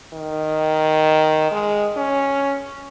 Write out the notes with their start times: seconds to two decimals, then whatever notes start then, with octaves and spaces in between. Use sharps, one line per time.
0.13 D#3
1.51 G#3
1.97 C#4